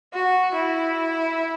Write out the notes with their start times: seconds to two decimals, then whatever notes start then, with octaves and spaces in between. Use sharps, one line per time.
0.14 F#4
0.54 E4